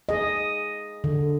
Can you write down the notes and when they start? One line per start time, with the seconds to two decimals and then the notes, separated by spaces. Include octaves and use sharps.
0.09 G#4 D#5
1.04 D3